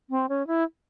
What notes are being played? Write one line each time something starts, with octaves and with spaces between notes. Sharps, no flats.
C4
C#4
E4